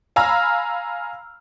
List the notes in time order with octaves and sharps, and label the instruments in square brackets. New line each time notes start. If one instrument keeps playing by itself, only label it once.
[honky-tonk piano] F5 G#5 A#5 B5 E6 F6